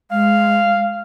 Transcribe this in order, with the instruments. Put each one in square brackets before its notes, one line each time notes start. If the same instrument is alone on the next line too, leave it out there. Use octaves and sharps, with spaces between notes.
[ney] G#3 [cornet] F5